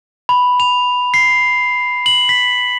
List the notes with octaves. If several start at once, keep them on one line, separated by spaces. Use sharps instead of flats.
B5
F7
C7
F#7
B6